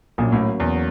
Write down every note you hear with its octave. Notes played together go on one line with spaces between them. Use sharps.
A#1 A#2 F#3 A#3 C#4
A1 A2
E2